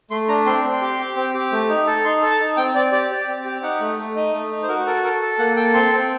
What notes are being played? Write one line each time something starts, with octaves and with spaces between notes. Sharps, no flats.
A3 C6
D4 A#5
C4 C6
C4
C6
G4
G4
C4
G4
A3
D#4
A4
D#4 C6
A4
A5
D#4
C4 G5
C4 D5
G4 D5
G4 D5
C4
G4
D#4 F#5
A3
A3
D#4 D#5
A3
D#4
C5
F#4 A#4
A4 A#4
A4 A#4
A4
A#3 F#5
A4 G5
C4 C6
C4